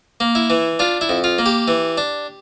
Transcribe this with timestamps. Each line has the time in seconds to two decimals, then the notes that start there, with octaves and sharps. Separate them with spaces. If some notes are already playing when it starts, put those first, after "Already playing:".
0.20 A#3
0.35 E4
0.50 E3
0.79 D4 F4
1.01 E4
1.09 F2
1.24 F4
1.39 A#3
1.46 G4
1.68 E3
1.98 D4